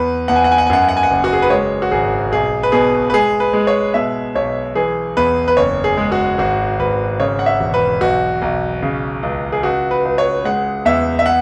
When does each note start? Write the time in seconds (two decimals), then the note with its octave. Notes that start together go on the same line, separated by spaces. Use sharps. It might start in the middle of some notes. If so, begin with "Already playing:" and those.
Already playing: E2 B4
0.28 E2 F#5
0.36 G#5
0.44 F#5
0.52 G#5
0.58 F#5
0.66 G#5
0.70 F#2 F#5
0.82 G#5
0.89 F#5
0.97 G#5
1.03 F#5
1.11 F#1
1.24 F#4
1.33 G#4
1.42 B4
1.50 G#3 C#5
1.82 F#4
1.91 G#1 G#4
2.32 B1 G#4
2.63 B4
2.72 B2 G#4
3.10 B4
3.14 G#3 G#4
3.40 B4
3.53 G#3
3.67 C#5
3.94 B2 E5
4.35 B1 C#5
4.75 E3 G#4
5.17 E2 B4
5.48 B4
5.57 F#1 C#5
5.84 G#4
5.97 G#3
6.12 F#4
6.38 G#1 F#4
6.79 G#1 B4
7.20 C#3 C#5
7.39 F#5
7.46 E5
7.60 E1
7.74 B4
8.01 B1 F#4
8.42 B1
8.83 C#3
9.23 C#2
9.52 G#4
9.63 C#2 F#4
9.91 B4
10.05 C#2
10.18 C#5
10.45 G#3 F#5
10.85 E2 E5
11.19 E5
11.26 F#5